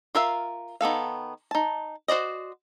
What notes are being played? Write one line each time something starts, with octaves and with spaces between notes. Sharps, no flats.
F4 A#4 E5 F5
D#3 B3 A4 F5
D#4 A5
F#4 C5 D5 D#5